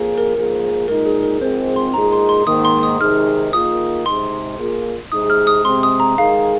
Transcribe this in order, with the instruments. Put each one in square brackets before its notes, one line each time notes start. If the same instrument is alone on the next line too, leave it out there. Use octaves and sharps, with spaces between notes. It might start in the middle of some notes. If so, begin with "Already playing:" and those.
Already playing: [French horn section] F2 F3 A#3 G#4
[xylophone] A#4
[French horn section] G#2 F3 A#3 G#4
[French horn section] A#2 G#3 D#4 [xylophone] A#4
[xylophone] G#4
A#4
[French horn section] G#2 F3 G#3 C4 [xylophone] C5
[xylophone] C6
[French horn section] A#2 G#3 D#4 G#4 [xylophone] A#5
[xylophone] C6
C6
[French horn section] G#2 D#3 A#3 [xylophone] D#6
[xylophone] C6
D#6
[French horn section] C3 D#3 G#3 D#4 G#4 [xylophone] F6
[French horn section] D#3 A#3 F4 G#4 [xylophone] D#6
[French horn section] C3 G#3 D#4 G#4 [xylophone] C6
[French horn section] A#2 A#3 F4 G#4
[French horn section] C3 G#3 D#4 G#4 [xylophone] D#6
[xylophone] F6
D#6
[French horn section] C3 G#3 C4 [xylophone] C6
[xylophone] D#6
A#5
[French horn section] D#3 G#3 D#4 G#4 [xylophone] F5